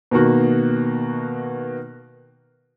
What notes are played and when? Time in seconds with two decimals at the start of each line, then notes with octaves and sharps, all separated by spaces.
0.11 B2 D#3 A#3 F#4